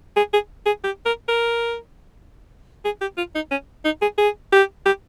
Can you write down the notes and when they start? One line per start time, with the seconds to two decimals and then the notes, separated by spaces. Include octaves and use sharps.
0.17 G#4
0.33 G#4
0.66 G#4
0.84 G4
1.05 A#4
1.28 A#4
2.85 G#4
3.01 G4
3.17 F4
3.35 D#4
3.51 C#4
3.85 D#4
4.02 G#4
4.18 G#4
4.52 G4
4.86 G4